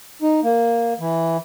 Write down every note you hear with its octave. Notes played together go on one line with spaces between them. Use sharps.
D#4
A#3
E3